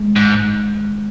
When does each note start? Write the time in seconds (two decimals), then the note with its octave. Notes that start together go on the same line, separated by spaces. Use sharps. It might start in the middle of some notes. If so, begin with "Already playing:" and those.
Already playing: G#3
0.16 G#2